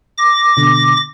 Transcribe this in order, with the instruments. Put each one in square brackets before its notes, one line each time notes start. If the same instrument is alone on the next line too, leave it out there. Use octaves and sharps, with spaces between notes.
[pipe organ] D6 A#6
[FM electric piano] B2 D3